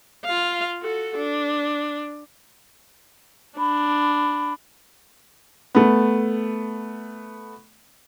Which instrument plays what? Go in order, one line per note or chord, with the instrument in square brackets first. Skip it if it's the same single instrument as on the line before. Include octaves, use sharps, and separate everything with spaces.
[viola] F4 F5
F#4 A4
D4
[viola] D4 [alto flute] B5
[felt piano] A3 B3